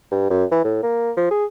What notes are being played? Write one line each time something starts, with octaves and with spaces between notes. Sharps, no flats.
G2
F#2
E3
A2
A#3
F3
G#4